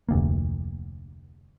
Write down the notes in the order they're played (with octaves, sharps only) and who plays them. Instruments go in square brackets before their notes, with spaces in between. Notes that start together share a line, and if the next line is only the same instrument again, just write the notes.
[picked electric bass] F1 D2 A#3